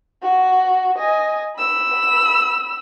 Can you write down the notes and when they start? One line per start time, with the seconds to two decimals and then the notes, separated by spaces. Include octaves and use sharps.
0.22 F#4
0.98 D#5 G#5
1.57 B5 E6